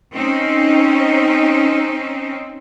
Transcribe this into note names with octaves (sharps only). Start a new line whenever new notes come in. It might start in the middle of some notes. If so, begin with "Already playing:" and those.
C4 C#4 D#4